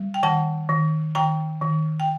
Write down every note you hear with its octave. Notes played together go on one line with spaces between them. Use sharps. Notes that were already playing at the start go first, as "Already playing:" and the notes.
Already playing: G3
G5
D#3 F#5 A5
D#3
D#3 G5 A#5
D#3
G5